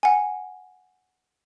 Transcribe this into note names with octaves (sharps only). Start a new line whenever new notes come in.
F#5 G#5